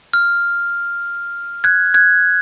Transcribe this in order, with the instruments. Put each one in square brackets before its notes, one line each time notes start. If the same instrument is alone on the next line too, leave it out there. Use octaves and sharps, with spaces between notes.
[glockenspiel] F6
F#6 G#6
F#6 G#6